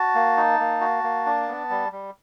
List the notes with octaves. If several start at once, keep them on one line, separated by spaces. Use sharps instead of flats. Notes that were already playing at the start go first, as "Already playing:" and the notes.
Already playing: F#4 A5
A#3
D#4
A#3
F#4
A#3
D4
B3
G3
G3